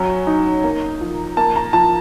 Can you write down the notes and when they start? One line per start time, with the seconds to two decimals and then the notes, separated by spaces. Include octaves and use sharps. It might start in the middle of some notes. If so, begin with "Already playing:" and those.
Already playing: F#3 C#4
0.27 D#4
0.64 A#3
1.01 F3
1.37 A#3 A5
1.56 A#5
1.73 F3 A5